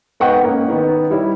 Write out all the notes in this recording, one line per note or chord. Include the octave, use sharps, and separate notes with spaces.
G#2 B3 D#5 F#5 G5 C#6
A#3 C#4
D#3 B3
G3 E4 C#5